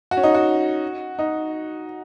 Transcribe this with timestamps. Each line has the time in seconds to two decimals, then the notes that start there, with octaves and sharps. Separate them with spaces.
0.11 F#4
0.17 C#4
0.23 D#4
0.35 F#4
1.19 D#4